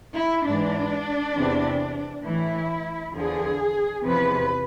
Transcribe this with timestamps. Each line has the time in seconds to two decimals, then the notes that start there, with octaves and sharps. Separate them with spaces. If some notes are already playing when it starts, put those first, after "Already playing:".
0.15 E4
0.45 G#2 E3 D4
1.34 E2 C3 E3
2.24 A2 E3 E4
3.14 E2 D3 F3 G#4
4.03 E2 C3 F3 B4